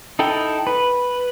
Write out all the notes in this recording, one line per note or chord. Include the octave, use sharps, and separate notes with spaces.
D#4 E4 A4 G5
B4